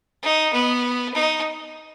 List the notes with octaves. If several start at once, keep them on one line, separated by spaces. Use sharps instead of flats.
D#4
B3
D#4